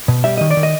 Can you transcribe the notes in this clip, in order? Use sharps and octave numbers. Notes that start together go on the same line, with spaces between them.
B2
G3 E5
D#3 D#5
D5
D#3
D#5